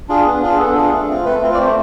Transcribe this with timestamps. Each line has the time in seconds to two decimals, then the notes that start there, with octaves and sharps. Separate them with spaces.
0.09 D4 F4 G#4
0.25 B3
0.42 D4 F4 G#4
0.58 B3 A4
0.74 D4 F4 G#4
0.92 A3
1.09 C4 F4
1.25 A3 B4
1.41 C4 F4
1.54 D5
1.58 A3 C5